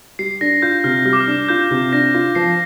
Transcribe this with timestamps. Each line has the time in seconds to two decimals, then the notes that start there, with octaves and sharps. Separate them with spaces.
0.19 G3 C7
0.41 D4 A#6
0.62 F4 G6
0.84 C3 F6
1.05 G3 F6
1.13 D6
1.20 F6
1.27 D4
1.49 F4 G6
1.71 C3
1.92 D4 A#6
2.14 F4
2.35 F3 C7